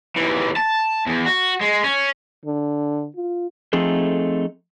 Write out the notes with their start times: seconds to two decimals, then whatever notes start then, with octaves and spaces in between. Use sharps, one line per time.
0.16 D#2 E3
0.56 A5
1.06 E2
1.26 F#4
1.61 G#3
1.84 C#4
2.45 D3
3.16 F4
3.73 F3 A3 C4 D#4 G#4 A4